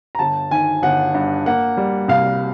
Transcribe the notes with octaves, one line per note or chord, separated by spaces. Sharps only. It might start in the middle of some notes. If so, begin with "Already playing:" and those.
A#5
G1 A5
D#3 G#5
G1 F#5
G2
A#3 F#5
G3
C2 F5